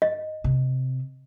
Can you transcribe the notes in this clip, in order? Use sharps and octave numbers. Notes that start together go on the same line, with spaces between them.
D#5
C3